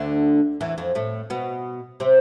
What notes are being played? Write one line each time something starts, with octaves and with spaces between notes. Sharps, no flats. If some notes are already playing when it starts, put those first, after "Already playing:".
Already playing: D2 D3
E2 E3
F2 F3
A2 A3
B2 B3
C3 C4